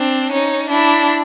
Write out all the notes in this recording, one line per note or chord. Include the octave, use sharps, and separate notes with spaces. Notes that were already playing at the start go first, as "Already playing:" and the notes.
Already playing: C4 D4
C#4 D#4
D4 E4